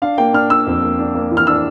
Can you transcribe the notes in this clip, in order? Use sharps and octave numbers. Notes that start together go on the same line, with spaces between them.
D4 F5
A#3 G5
D4 F6
D4 E6
F2
A#3
D4
A#3
E3
F6
D4 E6